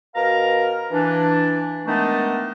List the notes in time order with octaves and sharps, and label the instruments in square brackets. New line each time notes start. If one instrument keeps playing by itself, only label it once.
[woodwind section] B2 A#4 F5 A#5
E3 D4
D#3 G#3 A3 B3 D4 D#4